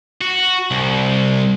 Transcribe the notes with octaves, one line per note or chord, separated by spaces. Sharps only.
F#4
C2